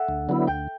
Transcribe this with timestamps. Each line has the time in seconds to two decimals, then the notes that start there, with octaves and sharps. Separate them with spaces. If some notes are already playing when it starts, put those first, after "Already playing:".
Already playing: A4 E5 F#5
0.08 D2
0.29 D3 F#3 B3 E4
0.47 D2 G5